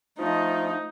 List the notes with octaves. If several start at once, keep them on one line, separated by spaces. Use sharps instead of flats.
F3 A3 D#4